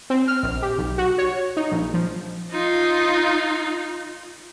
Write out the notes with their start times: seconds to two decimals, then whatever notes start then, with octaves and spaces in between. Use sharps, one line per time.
0.10 C4
0.28 F6
0.43 A#1
0.62 G4
0.78 B1
0.98 F#4
1.18 C#5
1.57 D#4
1.72 A#1
1.94 F3
2.51 D#4 F4